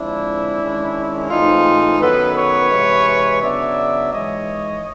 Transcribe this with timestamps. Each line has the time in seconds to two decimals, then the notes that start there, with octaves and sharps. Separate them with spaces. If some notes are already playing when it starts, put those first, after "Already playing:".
Already playing: D3 F3 G#3 C4 D4 E4
0.61 D#3 G#3 C#4
1.30 G#2 E3 A3 C4 D#4 F4
2.00 F#2 D#3 F#3 B3 A4 B4
2.35 B4 C#5
2.70 C3 E3 G#3
3.40 C#3 F#3 B3 D4 D5 E5
4.11 G#2 E3 G#3 C#5 D#5